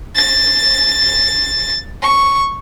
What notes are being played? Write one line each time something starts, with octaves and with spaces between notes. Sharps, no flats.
A6
C#6